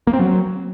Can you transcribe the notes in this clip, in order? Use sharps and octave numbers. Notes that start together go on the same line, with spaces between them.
A#3
C4
F#3